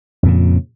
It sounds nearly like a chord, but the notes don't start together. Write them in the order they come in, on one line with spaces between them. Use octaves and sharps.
F2 A#2 C#3